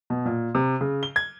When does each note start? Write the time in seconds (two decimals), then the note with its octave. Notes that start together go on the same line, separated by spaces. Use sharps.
0.10 B2
0.25 A#2
0.55 C3
0.81 C#3
1.03 G7
1.16 G#6